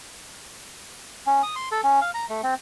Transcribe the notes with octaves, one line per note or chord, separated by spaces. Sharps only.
C#4
D#6
C6
A4
C#4
F5
A#5
A3
C4